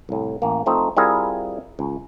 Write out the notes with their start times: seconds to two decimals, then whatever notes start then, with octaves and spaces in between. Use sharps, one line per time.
0.09 C2 A2
0.42 A1 A#3
0.66 F3 A3 C4 D#4
0.97 G3 C4 E4 F4 G#4 A#4
1.79 C#2